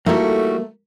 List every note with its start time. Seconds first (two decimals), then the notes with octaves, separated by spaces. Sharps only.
0.06 G3 A3 A#3 D#4 E4 F#4 A4